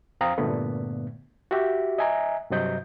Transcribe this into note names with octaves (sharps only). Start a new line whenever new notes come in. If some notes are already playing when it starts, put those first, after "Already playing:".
F2 C4 F5 G5 A#5 D#6
G2 A#2 D3 A3 B3
F#4 G4 E5
D#5 E5 G#5 A#5
G2 C3 F#3 D#5 G6